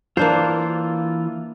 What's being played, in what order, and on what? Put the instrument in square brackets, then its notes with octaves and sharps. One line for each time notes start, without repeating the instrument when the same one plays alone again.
[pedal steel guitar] E3 F4 [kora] A#3 D4 C5